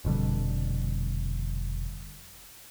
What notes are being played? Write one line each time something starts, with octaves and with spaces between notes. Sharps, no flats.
F1 B2 D3 G3